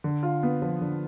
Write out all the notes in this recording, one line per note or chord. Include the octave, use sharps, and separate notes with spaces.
D3
F4
B3
F3
D3